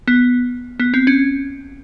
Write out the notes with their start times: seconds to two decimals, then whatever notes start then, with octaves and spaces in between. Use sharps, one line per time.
0.08 B3
0.80 B3
0.94 C4
1.07 C#4